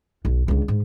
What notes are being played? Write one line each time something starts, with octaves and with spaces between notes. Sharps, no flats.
B1
C#2 D3
G#2